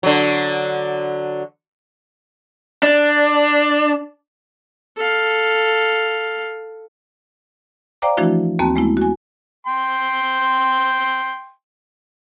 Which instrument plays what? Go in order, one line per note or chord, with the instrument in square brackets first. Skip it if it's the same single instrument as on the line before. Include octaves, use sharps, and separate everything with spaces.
[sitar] D3 F#3
[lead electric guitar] D4
[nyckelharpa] A4 F5
[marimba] C5 D5 F5 G5 A#5 D6
E3 F3 A3 D4 E4 F#4
D#2 A#3 C4 F#4 A5
G#3 A3 B3 E4
F#4 G#5
[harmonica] G5 C6